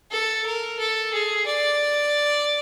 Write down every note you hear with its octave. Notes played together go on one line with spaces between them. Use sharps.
A4
A#4
A4
G#4
D5